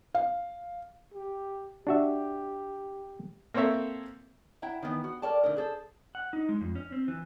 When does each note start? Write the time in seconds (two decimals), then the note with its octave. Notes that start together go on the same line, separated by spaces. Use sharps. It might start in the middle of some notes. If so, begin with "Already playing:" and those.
0.15 F5
1.14 G4
1.87 D4 F#4 G4 E5
3.54 A#3 C4 A4 C#5 E5
4.62 E4 E5 F#5 G5 A#5
4.82 D#3 E3 B3 D#4
5.04 F#4
5.22 A4 A#4 C#5 D5 G5 A5
5.43 D3 A3 D#4 A#4
5.56 G#4 A4 C5
6.15 F#5
6.33 D#4
6.49 G#3
6.61 F2
6.75 C#4
6.92 C4
7.08 E3